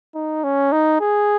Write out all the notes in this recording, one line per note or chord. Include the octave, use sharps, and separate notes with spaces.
D#4
C#4
D#4
G#4